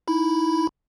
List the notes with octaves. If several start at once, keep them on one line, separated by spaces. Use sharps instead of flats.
D#4 E4 B5